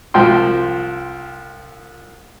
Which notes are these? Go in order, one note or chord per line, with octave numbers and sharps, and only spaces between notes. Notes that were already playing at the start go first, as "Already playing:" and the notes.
C2 F3 G5 C6